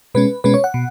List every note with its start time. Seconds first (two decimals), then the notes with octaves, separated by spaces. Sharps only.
0.15 B2 G#3 C#4 B4
0.44 B2 G#3 C#4 B4
0.54 C#5
0.64 F#5
0.74 B2